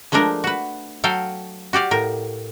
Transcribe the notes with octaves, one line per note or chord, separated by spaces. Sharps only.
F3 G#3 A3 D4 A#4
F#4 B4
F#3 A4 F5 G5
F#4 G4 D5 F5
A2 A#4